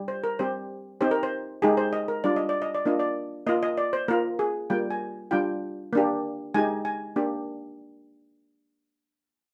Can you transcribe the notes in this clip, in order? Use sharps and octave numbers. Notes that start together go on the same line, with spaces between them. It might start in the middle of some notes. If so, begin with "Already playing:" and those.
Already playing: G3 G4
C5
A#4
G3 C4 G4 C5
C4 D#4 G4 C5
A#4
C5
G#3 D#4 G4 G#4
C5
D#5
A#4
G3 D4 F4 D5
D#5
D5
D#5
D5
A#3 D4 F4 D#5
D5
A#3 F4 D#5
D#5
D5
C5
A#3 F4 A#4
G#4
G3 A#3 F4 G5
G#5
G3 D4 F4 G5
A#3 D4 G4
G#3 D#4 G4 G#5
G#5
A#3 D4 G4